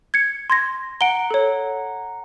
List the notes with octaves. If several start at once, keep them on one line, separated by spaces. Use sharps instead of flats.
G#6 C#7
C6 G#6 A#6
F#5 A#5 D7 G7
A4 C#5